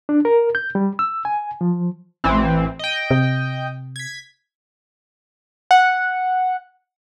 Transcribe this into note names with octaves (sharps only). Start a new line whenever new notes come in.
D4
A#4
G6
G3
E6
G#5
F3
A1 E3 C4
D#5 G5
C3
G#6 B6
F#5